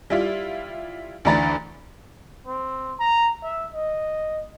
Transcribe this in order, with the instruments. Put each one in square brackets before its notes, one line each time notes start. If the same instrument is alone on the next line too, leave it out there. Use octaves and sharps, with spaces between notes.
[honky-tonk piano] G3 E4 F4
D2 E3 D4 A#5 B5 A6
[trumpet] C4
A#5
E5
D#5